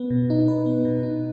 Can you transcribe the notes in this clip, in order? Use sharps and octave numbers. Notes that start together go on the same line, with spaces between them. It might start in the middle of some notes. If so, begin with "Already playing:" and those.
Already playing: B3 B4
B2
D#4
B4
B3
B2
D#4